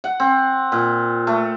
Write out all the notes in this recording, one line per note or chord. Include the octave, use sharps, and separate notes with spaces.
F#5
C4
A#2
A3